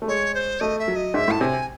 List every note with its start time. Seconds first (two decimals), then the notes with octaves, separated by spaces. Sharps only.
0.02 A3
0.08 G#3 C#5
0.34 C5
0.60 A3 D#5
0.79 E5
0.88 F#3
0.96 D#5
1.14 G#2 E5
1.28 A2 A5
1.41 C3 G#5